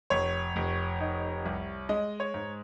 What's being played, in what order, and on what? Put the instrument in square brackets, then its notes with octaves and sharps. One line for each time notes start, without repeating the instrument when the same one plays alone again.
[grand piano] F1 C#5
F1
D#4
C2
G#3 D#5
C#5
G#2